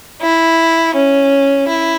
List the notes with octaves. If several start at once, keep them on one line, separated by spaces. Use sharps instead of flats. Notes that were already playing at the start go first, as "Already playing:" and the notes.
E4
C#4
E4